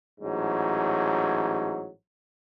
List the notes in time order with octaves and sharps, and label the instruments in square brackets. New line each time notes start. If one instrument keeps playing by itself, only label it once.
[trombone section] A1 G#2 F#3